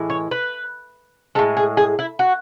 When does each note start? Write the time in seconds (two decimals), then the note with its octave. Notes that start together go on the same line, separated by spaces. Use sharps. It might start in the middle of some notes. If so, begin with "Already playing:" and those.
Already playing: A2 E3 G#3
0.10 C#5
0.31 B4
1.35 G#3 A4
1.39 A2
1.57 G#4
1.77 G#4
1.99 E4
2.19 F#4